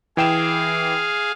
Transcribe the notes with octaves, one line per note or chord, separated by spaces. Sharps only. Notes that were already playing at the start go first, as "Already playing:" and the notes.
E3 G#4 F5 G5 E7